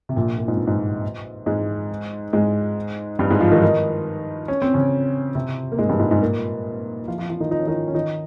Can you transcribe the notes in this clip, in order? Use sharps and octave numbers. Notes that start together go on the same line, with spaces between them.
C3
A#1 A#2
A#2
G#2
G2
G#2
G#2 G#3
G#2 G#3
G2 G3
G#2 G#3
F3 F4
D#3 D#4
D#3 D#4
C#4
C4
C#3 C#4
C3 C4
A#3
G#2 G#3
G2 G3
G#2 G#3
G#2 G#3
A#2 A#3
F3 F4
F3 F4
F3 F4
D#3 D#4
D#4
C#4
D#3 D#4
C#4
D#3 D#4